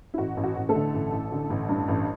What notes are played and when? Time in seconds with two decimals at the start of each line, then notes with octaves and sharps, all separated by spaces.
0.14 E4
0.18 A1 F#4
0.37 A1
0.43 F#4
0.56 A1
0.69 A3 A4
0.75 D3
0.94 A1
1.12 A1
1.32 D3
1.50 A1
1.69 G2
1.88 A1